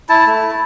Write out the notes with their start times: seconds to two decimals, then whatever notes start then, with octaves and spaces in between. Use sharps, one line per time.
0.09 E4 A5
0.27 A3
0.42 E4